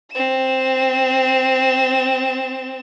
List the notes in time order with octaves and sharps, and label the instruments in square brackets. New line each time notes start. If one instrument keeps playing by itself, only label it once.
[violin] C4 E7